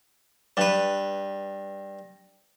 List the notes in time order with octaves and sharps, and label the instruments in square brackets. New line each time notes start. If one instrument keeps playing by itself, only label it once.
[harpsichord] G2 B4